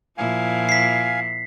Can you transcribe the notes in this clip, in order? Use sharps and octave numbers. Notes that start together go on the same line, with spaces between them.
A#2 F3 E4 F5 G#5
B6 C7